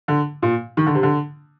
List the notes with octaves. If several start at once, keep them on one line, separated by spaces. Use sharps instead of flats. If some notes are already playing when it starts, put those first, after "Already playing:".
D3
A#2
D#3
D3
C3
D3